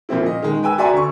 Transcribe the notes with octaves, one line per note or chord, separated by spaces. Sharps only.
A#2 F3 C4 E4
A#2 D#5
D#3 G#3
B4 G5 G#5 E6
F#4 D5 E5 G#5 A#5 C6
D2 C#6